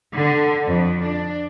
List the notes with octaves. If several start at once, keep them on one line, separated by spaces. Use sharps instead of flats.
D3
F2
D4